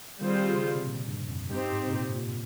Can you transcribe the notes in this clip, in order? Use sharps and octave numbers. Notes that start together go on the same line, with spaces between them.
D#3 G3 C4 F4 G#4 C5
C#3
C3
A#2
G2
F2
G2 C4 D#4 G4
G#2
C3
A#2
A#2